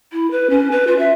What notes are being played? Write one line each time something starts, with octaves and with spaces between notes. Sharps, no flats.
E4
B4
C#4
B4
F4
E5